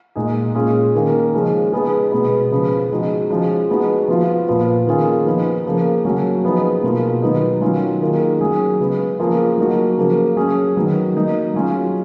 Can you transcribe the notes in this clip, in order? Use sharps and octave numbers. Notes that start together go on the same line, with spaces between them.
A#2 G#3 D#4 G#4
A#2 G#3 C#4 F4 G#4
D#3 A#3 C#4
C#3 F3 G#3 C#4
G#3 B3 D#4 G#4
B2 G#3 B3
C#3 F3 B3
F3 G#3 D#4 F#4
F3 G#3 C#4 F4
G#3 B3 D#4 F#4
F3 B3 F4
A#2 F3 B3 F4
D#3 A#3 C#4 F4 G#4
F3 B3 D#4
C#3 F3 A#3
C#3 F#3 A#3 C#4 F#4
F3 B3 D#4 G#4
B2 A#3 F4 G#4
D#3 F#3 B3 D#4
D#3 F#3 C#4 F4
D#3 A#3 F4 G#4
F#3 C#4 G#4
C#3 G#3 B3
F3 A#3 F4 G#4
F#3 A#3 D#4 F#4
C#3 F3 A#3
F#3 C#4 G#4
D#3 F#3 B3
F#3 A#3 D#4
F#3 C#4 F4 G#4